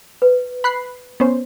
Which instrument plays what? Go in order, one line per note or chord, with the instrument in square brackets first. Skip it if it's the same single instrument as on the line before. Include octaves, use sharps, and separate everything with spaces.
[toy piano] B4
[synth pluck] B5 F#6 C7
B3 C#4 C5